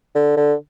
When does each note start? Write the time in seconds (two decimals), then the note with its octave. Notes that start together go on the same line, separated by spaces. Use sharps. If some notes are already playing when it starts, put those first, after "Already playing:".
0.15 D3
0.37 D3